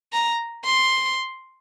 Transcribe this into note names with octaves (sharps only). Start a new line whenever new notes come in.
A#5
C6